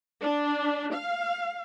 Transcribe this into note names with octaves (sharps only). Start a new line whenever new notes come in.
D4
F5